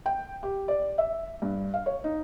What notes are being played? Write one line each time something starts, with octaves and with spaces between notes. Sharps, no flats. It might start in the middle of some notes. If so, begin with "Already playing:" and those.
G5
G4
D5
E5
G2
F5
C#5
D#4